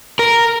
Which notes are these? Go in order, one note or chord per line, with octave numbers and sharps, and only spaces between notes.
A#4